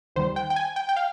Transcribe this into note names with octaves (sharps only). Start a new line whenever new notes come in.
D#2 D#3 G3 C5
G5
G5
G#5
G5
G5
F5